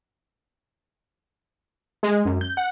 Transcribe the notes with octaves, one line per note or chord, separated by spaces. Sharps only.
G#3
F#2
G6
F#5